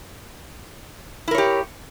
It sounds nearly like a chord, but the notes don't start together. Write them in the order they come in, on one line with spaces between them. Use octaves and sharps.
E4 A#4 C#5 G4